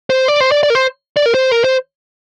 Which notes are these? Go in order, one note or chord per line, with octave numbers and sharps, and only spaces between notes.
C5
D5
C5
D5
D5
A#4
C5
D5
A#4
C5
A#4
C5